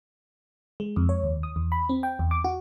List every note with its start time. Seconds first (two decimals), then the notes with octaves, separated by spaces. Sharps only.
0.80 G#3
0.96 F2
1.09 C#5
1.23 D#2
1.43 D#6
1.56 E2
1.72 B5
1.89 C4
2.03 G5
2.19 E2
2.31 D6
2.44 F#4